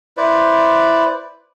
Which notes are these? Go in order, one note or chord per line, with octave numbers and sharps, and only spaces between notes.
E4 B4 C5 D5